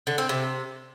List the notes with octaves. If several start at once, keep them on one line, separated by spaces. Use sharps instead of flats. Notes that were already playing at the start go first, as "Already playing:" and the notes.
D3
C4
C3